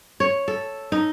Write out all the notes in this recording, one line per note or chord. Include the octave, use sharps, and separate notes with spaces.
C#5
A4
D#4